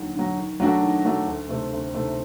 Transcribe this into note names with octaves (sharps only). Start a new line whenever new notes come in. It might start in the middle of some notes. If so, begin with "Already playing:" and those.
Already playing: D#2 D3 F#3
D3 F#3
D#3
F#3 A3 D4 F#4
D#3
F#3 A3 D4 F#4
D2
C3 D#3 A3 C4
D2
C3 D#3 A3 C4